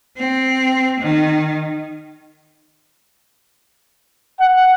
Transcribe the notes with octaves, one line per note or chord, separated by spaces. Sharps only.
C4
D#3
F#5